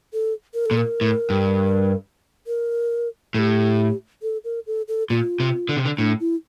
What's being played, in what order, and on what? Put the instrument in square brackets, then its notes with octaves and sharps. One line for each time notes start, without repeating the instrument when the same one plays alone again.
[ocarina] A4
A#4
A4
[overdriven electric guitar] A#2
[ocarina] A#4
[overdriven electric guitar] A2
G2
[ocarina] A#4
[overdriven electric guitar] A2 [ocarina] A4
[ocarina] G4
A4
A#4
A4
A4
[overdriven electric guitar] A#2 [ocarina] F4
[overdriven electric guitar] C3
D3
C3
D3
[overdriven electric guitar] A2 [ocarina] D4
[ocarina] E4